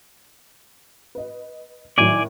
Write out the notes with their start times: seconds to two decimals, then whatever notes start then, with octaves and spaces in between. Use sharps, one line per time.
1.15 B4 D#5
1.98 A2 D#3 F#3 D5 G#5